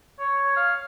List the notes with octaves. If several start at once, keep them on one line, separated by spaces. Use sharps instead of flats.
C#5
F5